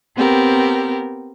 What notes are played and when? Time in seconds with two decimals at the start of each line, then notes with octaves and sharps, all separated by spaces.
0.16 B3 C4 G4 A#4